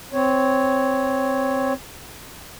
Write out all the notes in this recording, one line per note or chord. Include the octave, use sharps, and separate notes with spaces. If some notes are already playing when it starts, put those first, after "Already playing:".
C4 C#5